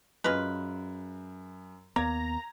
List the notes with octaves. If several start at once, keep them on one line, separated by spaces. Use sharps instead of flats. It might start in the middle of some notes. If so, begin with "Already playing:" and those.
F#2 G#3 F4 B4
D#2 A#3 B3 A#5 G#6